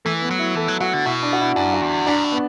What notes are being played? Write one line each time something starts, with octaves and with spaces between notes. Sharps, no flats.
E3 A3
B3
F#3
E4
E3 A4
F#3
F#3 F#4
D3
B2 E4
D4
F#4
E4
F#2 D4
F#4
E2
F#2 D4
A2
B3